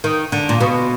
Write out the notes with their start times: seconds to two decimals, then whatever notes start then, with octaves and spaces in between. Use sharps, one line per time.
0.04 D#3
0.32 D3
0.49 A#2
0.60 B2